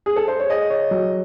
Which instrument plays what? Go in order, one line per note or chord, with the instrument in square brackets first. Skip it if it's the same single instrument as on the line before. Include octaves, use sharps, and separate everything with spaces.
[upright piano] G#4
A4
C5
C#5
[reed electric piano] G#4 [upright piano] D#5
[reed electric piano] C#5
F#3